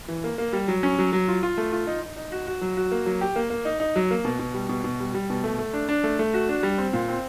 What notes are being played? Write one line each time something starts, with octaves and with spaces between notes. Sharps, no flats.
E3
A#3
A#3
G3
F#3
C#4
F#3
F#3
F4
F4
A3
F4
D#4
D#4
D#4
F#4
F#4
F#3
F#4
A#3
F#3
G4
A#3
A#3
D#4
D#4
F#3
A#3
B2
B2
G3
B2
B2
G3
G3
B2
A3
A3
D4
D4
A3
A3
F#4
D4
G3
C4
A#2
C4